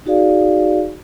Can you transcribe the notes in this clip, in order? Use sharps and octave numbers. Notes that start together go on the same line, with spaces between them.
D#4 F#4 G#4 D5 F5